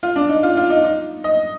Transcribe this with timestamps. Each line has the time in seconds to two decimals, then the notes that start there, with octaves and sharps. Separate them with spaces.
0.03 F4
0.16 D4
0.29 D#4
0.43 F4
0.57 F4
0.70 D#4
0.84 D#4
1.24 D#5